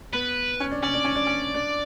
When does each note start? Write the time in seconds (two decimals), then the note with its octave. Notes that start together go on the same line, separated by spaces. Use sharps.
0.13 B3 B4
0.60 C#4
0.71 D4
0.83 C#4 D5
0.94 D4
1.04 C#4
1.15 D4
1.26 C#4
1.54 D4